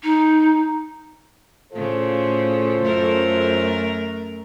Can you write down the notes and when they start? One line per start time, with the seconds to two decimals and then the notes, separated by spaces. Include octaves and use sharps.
0.03 D#4
1.73 A2 C#3 F4 A4 C5
2.83 F#2 A3 A#4